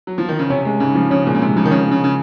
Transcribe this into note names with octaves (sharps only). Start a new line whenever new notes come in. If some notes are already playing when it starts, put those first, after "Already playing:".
F#3
F3
D#3
C#3
C3 C#4
G#3
G#2 C#3
F3
C#3 C#4
A#2 G#3
C#3
G#2 C3
C#3 F3
D#3
C#3 C#4
G#3
C#3
C#3